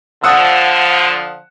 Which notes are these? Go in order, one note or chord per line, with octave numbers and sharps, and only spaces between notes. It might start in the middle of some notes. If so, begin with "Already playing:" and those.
D3 F3 F#5 D#6 E6